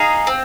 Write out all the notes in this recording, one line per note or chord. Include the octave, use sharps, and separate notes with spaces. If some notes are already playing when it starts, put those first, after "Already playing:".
Already playing: D#4 G#4 F5
C4